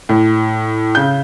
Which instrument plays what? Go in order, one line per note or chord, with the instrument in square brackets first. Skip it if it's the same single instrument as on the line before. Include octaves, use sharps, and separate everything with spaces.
[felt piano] A2
C#3 G6